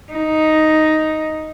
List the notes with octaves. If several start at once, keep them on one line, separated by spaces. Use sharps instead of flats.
D#4